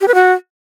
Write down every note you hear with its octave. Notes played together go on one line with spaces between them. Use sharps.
G4
B4
F#4